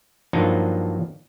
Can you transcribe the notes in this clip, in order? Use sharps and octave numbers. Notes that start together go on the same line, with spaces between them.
G2 F3 F#3 A#3 D4 D#4